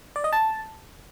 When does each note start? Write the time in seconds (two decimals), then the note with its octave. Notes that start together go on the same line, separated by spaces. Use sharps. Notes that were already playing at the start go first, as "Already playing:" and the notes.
0.16 D5
0.24 D#5
0.33 A5